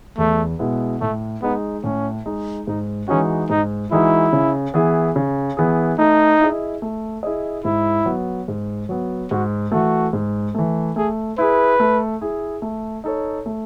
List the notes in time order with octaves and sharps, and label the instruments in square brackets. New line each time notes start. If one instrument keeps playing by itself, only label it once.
[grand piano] E2 [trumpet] A3
[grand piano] B2 G#3 B3 E4
[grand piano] A2 [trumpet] A3
[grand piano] G#3 D#4 [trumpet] B3
[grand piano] A2 [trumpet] C#4
[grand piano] G#3 D#4
[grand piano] G#2 [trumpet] D#4
[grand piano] E3 G#3 D#4 F#4 [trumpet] C#4
[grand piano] G#2 [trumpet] D#4
[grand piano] E3 G#3 D#4 F#4 [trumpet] E4
[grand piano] C#3
E3 B3 E4 G#4
C#3
E3 B3 E4 G#4
[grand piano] A3 [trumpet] D#4
[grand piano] E4 G#4 D#5
A3
E4 G#4 D#5
[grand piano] G#2 [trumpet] E4
[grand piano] F#3 B3
G#2
F#3 B3
[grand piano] G#2 [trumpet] F#4
[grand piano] E3 A3 [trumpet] F#4
[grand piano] G#2
E3 A3
[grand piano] A3 [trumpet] G#4
[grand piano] E4 G#4 [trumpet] B4
[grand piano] A3
E4 G#4
A3
D#4 A4 C#5
A3